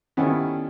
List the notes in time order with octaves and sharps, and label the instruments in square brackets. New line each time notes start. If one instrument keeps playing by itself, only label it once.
[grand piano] D#3 G3 B3 E4 A4 [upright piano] C#4